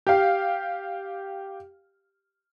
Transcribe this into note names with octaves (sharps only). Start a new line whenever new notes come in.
G4 F5